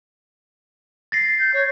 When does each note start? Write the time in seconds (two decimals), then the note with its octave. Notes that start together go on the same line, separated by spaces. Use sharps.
1.12 A6 A#6 C7
1.39 G6
1.53 C#5